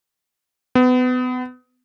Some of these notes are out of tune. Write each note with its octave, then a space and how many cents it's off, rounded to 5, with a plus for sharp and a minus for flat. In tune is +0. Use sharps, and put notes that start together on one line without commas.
B3 +30